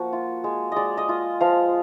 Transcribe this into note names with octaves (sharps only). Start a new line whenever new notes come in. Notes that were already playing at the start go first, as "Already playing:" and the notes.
Already playing: F3 A#3 F#4
F4
G#3
G#3 D5 D#5
D#5
F4
F3 F5